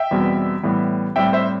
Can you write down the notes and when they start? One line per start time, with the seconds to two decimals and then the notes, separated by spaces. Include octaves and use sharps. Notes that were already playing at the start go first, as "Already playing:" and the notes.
Already playing: E5 G5
0.11 E2 B2 G3 C4
0.63 A2 E3 G3 B3
1.16 A2 G3 C4 E5 G5
1.33 C5 E5